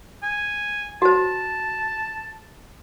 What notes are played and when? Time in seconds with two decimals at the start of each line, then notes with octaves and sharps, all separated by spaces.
0.23 G#5
1.02 F#4 C5 A5